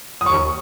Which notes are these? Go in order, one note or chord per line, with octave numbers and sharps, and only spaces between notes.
D#6
D#2 C#6